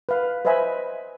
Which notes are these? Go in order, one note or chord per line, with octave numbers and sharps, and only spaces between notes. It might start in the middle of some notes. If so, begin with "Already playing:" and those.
B4 F5
B4 C5 D#5 E5 G#5 B5